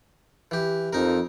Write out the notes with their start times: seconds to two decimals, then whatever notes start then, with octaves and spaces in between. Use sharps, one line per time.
0.51 E3 G4
0.93 F2 D#4 A#4